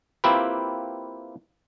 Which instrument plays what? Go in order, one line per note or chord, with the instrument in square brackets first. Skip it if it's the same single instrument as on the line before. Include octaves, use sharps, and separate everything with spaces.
[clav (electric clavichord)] A#3 C4 E4 F4 G4 B4